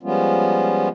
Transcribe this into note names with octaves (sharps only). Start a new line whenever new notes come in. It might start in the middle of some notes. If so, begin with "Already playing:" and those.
F3 G3 G#3 B3 C#4 F4